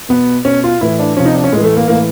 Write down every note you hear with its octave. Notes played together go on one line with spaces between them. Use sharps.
B2 B3
B2 C#4
F4
A2 E3 E4
D4
C3 F3 C#4
D#4
D4
C#4
A2 E3 G#3
A3
A#3
A2 E3 A#3